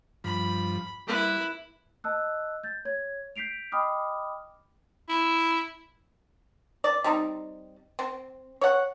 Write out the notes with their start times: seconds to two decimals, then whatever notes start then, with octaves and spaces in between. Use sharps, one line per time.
0.24 G2 F3 B5
1.07 G3 E4 B4
2.04 D#5 A5 E6 F#6
2.64 G6 A6
2.85 C#5 G#6
3.36 G6 B6 C7 D7 F7
3.72 D#5 G5 B5 D6 D#6 F6
5.09 E4
6.84 D5
7.04 G3 C4 D#4
7.99 C4
8.61 C#5 F#5